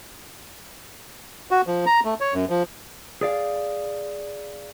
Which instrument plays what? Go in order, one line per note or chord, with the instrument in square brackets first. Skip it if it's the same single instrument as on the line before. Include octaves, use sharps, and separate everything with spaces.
[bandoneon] F#4
F3
A#5
A3
C#5
F#2
F3
[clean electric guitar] G#4 D5 F5